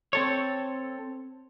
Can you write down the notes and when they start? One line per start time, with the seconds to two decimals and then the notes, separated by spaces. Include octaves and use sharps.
0.13 C4 A4 C#5